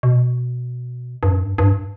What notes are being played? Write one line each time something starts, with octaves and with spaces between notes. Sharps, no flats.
B2
G2
F#2
G2
G2